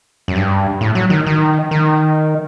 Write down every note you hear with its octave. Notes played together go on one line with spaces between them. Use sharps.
F#2
G2
A2
F#3
D#3
D#3
D#3